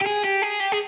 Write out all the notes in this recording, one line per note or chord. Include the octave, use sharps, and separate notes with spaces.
G4
G#4
G4
G#4
G4
G#4